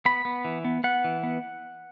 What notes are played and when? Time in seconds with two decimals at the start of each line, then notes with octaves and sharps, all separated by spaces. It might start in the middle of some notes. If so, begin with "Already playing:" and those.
0.05 B3 B5
0.25 B3
0.45 E3
0.65 B3
0.84 B3 F#5
1.04 E3
1.23 B3